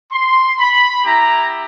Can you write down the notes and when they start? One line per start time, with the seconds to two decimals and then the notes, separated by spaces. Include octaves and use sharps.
0.12 C6
0.58 B5
1.04 B3 E4 G4 A#5